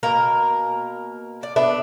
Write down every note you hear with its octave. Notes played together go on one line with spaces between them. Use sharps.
B2 A#3 A#4 A#5
D5
B3 D4 B4 E5